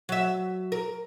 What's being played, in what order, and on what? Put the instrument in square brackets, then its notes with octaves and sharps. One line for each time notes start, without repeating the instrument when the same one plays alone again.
[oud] F#3 E5
A#4